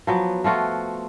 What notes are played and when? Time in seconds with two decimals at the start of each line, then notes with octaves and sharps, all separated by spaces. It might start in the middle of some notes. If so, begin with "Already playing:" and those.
0.07 F3 F#3 B3
0.44 F3 A3 F4 F#4